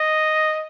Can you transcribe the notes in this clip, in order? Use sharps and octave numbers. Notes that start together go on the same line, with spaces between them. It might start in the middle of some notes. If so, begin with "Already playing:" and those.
Already playing: D#5